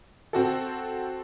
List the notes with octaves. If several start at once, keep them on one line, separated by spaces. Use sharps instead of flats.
C4 F#4 A4